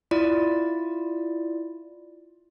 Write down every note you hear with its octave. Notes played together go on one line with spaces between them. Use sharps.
E4 F4 D5